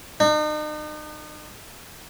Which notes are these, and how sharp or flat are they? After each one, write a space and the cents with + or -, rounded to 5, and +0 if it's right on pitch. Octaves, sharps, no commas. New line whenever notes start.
D#4 -40